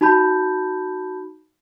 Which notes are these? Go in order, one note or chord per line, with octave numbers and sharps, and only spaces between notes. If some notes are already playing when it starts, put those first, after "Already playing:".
D#4 F#4 A5 B5 G6